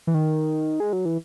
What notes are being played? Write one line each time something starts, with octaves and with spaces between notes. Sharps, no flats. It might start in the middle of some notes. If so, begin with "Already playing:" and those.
E3
D#3
G#3
F#3
E3